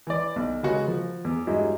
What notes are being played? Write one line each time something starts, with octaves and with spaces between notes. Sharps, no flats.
E3 D5
B1
C#3 G#3 A#3 F#4 F#5
F3
E2
G2 F#3 G#3 D#4 E4